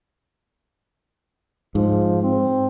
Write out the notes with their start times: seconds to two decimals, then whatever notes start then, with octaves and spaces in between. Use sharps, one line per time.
1.75 G#2 F3
2.23 C4